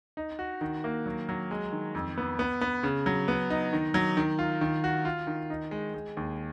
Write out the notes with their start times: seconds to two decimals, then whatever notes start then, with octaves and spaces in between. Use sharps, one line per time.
0.17 D#4
0.39 F#4
0.61 D#3
0.84 A#3
1.06 F#3
1.29 F#3
1.51 G#3
1.72 D#3
1.95 F2
2.17 B3
2.39 B3
2.61 B3
2.83 C#3
3.06 F#3
3.28 B3
3.50 D#4
3.73 D#3
3.94 F#3
4.17 D#3
4.39 F4
4.61 D#3
4.84 F#4
5.05 F4
5.27 D#3
5.50 D#4
5.71 G#3
5.94 G#3
6.17 D#2